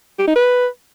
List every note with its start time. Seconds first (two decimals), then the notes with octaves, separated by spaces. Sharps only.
0.19 G4
0.27 D#4
0.36 B4